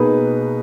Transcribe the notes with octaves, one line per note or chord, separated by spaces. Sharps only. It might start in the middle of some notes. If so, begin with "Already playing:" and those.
Already playing: B2 A#3 D#4 G#4 B4